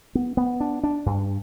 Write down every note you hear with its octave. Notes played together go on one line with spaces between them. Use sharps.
B3
B3
D4
D4
G2